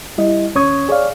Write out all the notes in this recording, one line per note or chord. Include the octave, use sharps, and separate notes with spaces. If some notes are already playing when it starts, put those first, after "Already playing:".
G3 E4 D#5
D#2 C#4 C#5 C#6 D#6 G#6
G#4 C#5 D5 F5